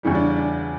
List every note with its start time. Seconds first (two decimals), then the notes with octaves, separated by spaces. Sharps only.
0.03 E2 C#3 E3 G3
0.15 D4
0.36 D4